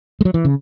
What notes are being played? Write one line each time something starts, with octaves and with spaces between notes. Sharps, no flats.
G#3
F#3
E3
C#3